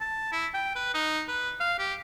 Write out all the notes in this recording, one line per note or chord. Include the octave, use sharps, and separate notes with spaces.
A5
E4
G5
B4
D#4
B4
F5
G4